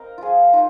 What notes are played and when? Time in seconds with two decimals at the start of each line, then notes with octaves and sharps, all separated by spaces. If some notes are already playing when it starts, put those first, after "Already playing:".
Already playing: C4 A#4 D#5 F5
0.18 F3 F4 G#4
0.53 D#4 F4